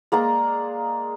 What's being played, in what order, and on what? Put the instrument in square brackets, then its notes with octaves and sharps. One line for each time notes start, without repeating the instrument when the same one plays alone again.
[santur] G#3 A#3 D5 A#5